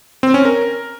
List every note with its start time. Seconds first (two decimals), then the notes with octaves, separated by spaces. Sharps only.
0.23 C4
0.34 C#4
0.45 A#4